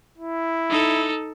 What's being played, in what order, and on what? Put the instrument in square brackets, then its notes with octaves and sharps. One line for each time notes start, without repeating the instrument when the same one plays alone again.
[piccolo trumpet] E4
[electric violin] D#4 A4